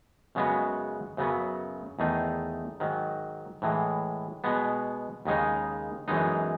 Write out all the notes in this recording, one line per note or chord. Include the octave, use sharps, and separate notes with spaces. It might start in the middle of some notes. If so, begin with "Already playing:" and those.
F#2 C#3 G#3 B3 F#4
F#2 C#3 F#3 B3
E2 D#3 A3 D#4 G#4
G#2 D#3 F#3
A2 E3 G#3
B2 G#3 B3
D#2 C#3 G#3 D#4
F#2 E3 G#3 B3 D#4